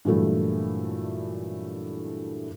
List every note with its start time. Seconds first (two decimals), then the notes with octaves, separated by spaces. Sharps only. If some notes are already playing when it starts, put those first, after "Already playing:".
0.05 G2 A#2 E3 F#3 A3 E4